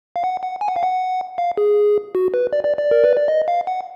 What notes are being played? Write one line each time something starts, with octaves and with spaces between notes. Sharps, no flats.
F5
F#5
F#5
G#5
F#5
F5
F#5
F5
G#4
F#4
B4
D5
D5
D5
A#4
B4
D5
D#5
F5
F#5